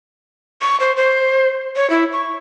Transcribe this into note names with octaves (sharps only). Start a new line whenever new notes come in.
C#6
C5
C5
C#5
E4
C#6